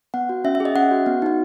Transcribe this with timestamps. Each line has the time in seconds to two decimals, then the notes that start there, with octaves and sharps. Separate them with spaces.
0.14 B3 F#5
0.29 F#4
0.44 C#4 E5
0.55 E5
0.60 G#4
0.65 D#5
0.75 C#4 F#5
0.91 F#4
1.06 B3
1.22 D#4 F#4